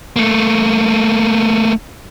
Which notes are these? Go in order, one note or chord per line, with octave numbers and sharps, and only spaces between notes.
A3 A#3